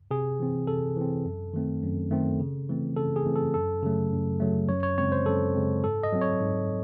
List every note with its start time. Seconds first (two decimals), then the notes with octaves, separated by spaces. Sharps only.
0.11 C3 G#4
0.40 E3 C4
0.67 C3 A4
0.96 E3 C4
1.25 F#2
1.54 D#3 A3 C4
1.82 F#2
2.11 D#3 A3 C4
2.40 C#3
2.69 E3 A3 C4
2.97 C#3 A4
3.16 G#4
3.26 E3 A3 C4
3.36 A4
3.54 F#2 A4
3.83 C#3 F#3 A3
4.12 F#2
4.40 C#3 F#3 A3
4.69 F#2 C#5
4.83 C#5
4.98 C#3 G#3 C4 C#5
5.12 C5
5.26 F#2 A4
5.55 C#3 G#3 C4
5.84 G#2 A4
6.03 D#5
6.12 F#3 C4
6.21 C#5
6.41 G#2